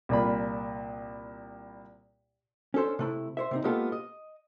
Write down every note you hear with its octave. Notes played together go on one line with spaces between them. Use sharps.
C2 A#2 B5
C#4 D4 A4 C5
C3 A3 E4
C5 C#5 E5
C3 C4 D#4
G#3 A#3 B3 F4 G4 A4
D#5